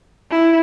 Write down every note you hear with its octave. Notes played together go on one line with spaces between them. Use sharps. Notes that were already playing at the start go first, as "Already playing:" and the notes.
E4